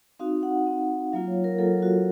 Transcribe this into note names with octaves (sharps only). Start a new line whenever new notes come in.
C4 D#4 F#4 F5
F#5
C4 D#4 F#4
F#3 A#3 F4 F5
C#5
A#4
F#3 A#3 F4 A4
F#4